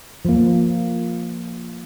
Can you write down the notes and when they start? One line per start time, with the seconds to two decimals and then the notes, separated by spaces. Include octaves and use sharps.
0.25 F3 A#3